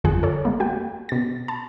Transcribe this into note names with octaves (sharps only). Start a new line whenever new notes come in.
G1 F2 D3 F4 G#4 F#6
A4 C#5
G#3 A#3
A#3 F#4 F#5 G5
B2 A6
A5 B5